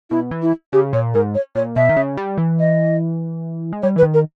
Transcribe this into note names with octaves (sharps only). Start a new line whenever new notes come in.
B2 E4
E3
E4
C#3 G4
A#2 C#5
G#2 A#4
C#5
A#2 C#5
B2 E5
D#3
C#3
G3
E3
D#5
G#3
G3 C#5
E3 B4
D#3
A#4